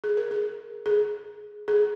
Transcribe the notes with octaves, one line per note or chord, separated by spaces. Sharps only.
G#4
A#4
G#4
G#4
G#4